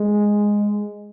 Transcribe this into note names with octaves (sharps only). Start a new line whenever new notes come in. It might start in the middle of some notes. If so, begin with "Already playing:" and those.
Already playing: G#3